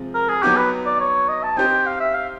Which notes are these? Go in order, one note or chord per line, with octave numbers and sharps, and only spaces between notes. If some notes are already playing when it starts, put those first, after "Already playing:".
Already playing: C3 F3 G#3
A#4
G#4
F#3 B3 D#4 F#4 G4
B4
D5
C#5
D#5
A5
C4 D#4 G4 C5 D#5 G5
F5
E5
F5